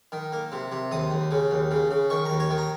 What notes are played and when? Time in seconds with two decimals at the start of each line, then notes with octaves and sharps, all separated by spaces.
0.12 D#3
0.32 A#3
0.52 C3
0.72 C3
0.91 D#2 D#6
1.11 D#2
1.31 C#3
1.51 D#2
1.71 C#3
1.91 C#3
2.10 D#3 C#6
2.25 D#2 A#5
2.40 C#5
2.50 D#3
2.58 A#5